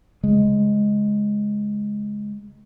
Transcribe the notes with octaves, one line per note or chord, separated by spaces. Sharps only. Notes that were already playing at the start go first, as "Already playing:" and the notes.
C#3 G#3